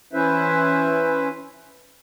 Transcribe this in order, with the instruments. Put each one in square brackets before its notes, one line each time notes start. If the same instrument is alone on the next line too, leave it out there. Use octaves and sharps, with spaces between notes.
[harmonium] E3 C#4 E4 B4 C5 E5